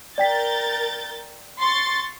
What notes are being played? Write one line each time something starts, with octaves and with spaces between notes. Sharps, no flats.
A#4 D5 G5 G6 A6 B6
C6 C#6 A6